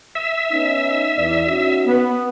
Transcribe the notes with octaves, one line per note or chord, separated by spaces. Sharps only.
E5
B3 C#4 D#4
E2 D5
C#4 D#4 F#4
B3